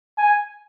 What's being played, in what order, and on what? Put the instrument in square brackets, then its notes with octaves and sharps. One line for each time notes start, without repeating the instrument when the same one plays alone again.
[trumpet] G#5